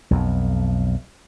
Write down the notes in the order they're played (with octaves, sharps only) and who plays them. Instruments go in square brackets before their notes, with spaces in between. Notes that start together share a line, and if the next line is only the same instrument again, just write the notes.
[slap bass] B1 F2